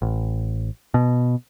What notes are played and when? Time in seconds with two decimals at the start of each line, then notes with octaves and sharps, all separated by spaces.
0.02 A1
0.94 B2